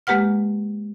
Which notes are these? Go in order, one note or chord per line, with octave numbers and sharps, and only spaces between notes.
G#3 A#3 G4 B4 F#5 F6